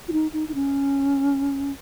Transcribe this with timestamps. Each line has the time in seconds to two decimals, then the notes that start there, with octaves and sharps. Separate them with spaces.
0.08 F4
0.13 D#4
0.33 D#4
0.49 D#4
0.55 C#4